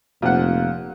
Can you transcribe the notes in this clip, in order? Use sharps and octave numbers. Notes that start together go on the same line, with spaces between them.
F1 A#2 F3 F#5